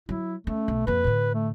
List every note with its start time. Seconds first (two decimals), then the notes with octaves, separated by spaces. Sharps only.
0.09 F#3 E4
0.47 A3 C#4
0.68 B1
0.87 F2 A#3 B4
1.04 A2 D3
1.34 A3